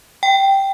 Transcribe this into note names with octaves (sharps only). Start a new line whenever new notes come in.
G5